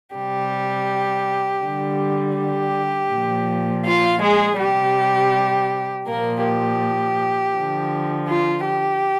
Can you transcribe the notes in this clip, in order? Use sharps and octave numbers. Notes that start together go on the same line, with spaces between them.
C3 G3 G4
D3 G3
G4
A#2 F3
F4 F5
G#3 G#4
C3 G3 G4
A#2 F3 A#3 A#4
G4
D3 F3
F4
G4